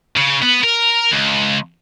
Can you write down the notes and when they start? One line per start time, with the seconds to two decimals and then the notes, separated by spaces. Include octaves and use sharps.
0.16 C#3
0.42 B3
0.64 A#4
1.12 C#2